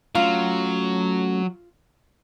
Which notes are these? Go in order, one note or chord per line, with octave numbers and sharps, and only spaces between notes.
F#3 A3 C#4 F4